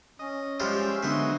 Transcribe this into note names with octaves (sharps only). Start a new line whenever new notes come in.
C#4 D#5
F3 G3 G#3 E5 F5 G5
D3 F#3 G#3 B3 C5 E5